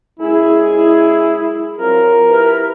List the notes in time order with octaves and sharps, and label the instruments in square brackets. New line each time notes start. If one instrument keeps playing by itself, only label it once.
[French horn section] F#2 G#3 G#4 [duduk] E4
[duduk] E4
[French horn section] F#3 C4 F4 [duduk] A#4
[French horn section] E4 G4 B4